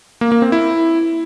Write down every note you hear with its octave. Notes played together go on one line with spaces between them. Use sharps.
A#3
A#3
C4
E4